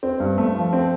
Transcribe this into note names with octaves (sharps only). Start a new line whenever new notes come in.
C4
G2
A3
F3
C4